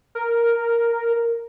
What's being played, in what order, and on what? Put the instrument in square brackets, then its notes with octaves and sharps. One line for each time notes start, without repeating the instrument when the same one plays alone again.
[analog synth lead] A#4